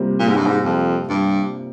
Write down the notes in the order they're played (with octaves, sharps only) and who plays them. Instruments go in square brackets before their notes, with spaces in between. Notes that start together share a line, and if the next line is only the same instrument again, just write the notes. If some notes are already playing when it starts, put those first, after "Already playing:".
Already playing: [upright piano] C3 G3 A#3 F4 C5
[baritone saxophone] A#2
G#2
G2
G#2
F2
G2